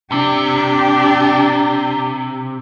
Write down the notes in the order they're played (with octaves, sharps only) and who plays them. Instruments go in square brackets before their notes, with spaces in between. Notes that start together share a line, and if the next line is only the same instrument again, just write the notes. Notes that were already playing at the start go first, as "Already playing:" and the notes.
[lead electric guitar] C3 [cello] D4 G4